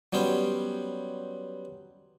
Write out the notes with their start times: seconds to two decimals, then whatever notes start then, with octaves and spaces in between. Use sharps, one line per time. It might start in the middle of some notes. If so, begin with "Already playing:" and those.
0.13 F#3 G3 B3 C#4 C5